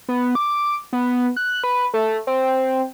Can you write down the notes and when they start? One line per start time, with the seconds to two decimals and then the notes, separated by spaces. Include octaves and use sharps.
0.09 B3
0.35 D6
0.93 B3
1.37 F#6
1.64 B4
1.94 A3
2.27 C4